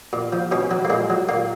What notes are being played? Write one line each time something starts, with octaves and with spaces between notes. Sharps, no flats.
A#2
F3
B2 C#4
F#3
A#3
A#2 G#3
F#3
A#2 A#3